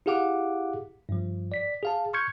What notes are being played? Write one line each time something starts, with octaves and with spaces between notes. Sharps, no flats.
E4 G4 G#4 F5 F#5 D6
G2 F3
D5 B6
G#4 F5 A5
C6 C#6 F6 G6 G#6 C#7